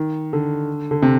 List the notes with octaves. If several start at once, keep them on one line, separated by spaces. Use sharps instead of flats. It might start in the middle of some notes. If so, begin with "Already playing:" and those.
Already playing: D#3
D3
D3
C3